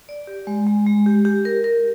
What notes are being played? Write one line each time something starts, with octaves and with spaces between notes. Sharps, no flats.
D5
G4
G#3
G#3
G#3
G4
G4
A#4
A#4